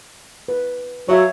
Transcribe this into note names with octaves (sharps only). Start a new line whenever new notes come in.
B4
F#3 C#5 E5 F5